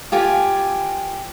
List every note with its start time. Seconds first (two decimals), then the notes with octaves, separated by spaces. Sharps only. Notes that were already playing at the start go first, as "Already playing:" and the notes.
0.12 F4 G4 G#5